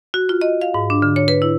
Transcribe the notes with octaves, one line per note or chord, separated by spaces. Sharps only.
F#4
F4
D#5
F5
G#2
D4
D3
C#5
B4
E4